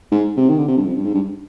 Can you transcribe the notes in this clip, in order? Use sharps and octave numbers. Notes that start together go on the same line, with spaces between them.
G#2
C3
D#3
D3
C3
G2
F2
G2
G#2
G2